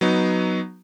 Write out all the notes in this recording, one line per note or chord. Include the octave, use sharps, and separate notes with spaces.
F#3 B3 D#4